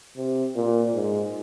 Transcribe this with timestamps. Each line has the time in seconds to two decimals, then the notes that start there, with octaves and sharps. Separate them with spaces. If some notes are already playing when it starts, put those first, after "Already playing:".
0.17 C3
0.56 A#2
0.95 G#2